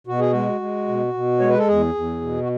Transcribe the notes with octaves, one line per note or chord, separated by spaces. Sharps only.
B2 F#4
G#4
G#3 F#4
G#3
B2
B2
G#3 C#5
B4
A4
E2 G#4
E2
B2
F#4